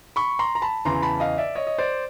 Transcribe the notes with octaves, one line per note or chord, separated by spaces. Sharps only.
B5 C#6
A#5 C6
A#5
A5 B5
E2 C#3 E3 A#5 C6
A5 B5
D#5 F5
D5 E5
C#5 D#5
D#5
C5 D5